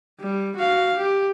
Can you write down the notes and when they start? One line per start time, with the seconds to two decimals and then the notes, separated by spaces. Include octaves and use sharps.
0.20 G3
0.56 F#4 F5
0.97 G4